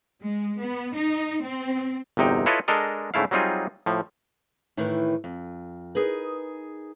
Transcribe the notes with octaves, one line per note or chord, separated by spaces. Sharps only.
G#3
B3
D#4
C4
G1 E2 C3 D#4 G5
E4 F4 A4 B4 C#5 D#5
G#3 D4 A4 A#4 D#5
G#2 C#3 A3 E4 F5
F#3 G3 C4 D#4 F4 G#4
A2 F3
A2 D#3 E3 E4 A#4 B4
F2
D#4 G#4 A#4 B4